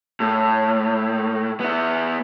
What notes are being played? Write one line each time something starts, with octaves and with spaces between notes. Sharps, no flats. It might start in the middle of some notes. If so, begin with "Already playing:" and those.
A2
B3 E4